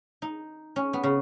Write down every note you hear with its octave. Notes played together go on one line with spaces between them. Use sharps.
D#4
C#4
B3
C#3